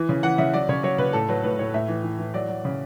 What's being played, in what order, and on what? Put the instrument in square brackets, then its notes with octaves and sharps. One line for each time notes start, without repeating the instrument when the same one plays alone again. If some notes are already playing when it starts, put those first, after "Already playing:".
Already playing: [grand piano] E3
C#3
E3 F#5
C#3 E5
F#3 D5
C#3 C#5
F#3 C#5
C#3 B4
A2 A4
F#3 B4
A2 B4
A2 C#5
A2 E5
E3
E3
E3
F#3 D5
F#3
C#3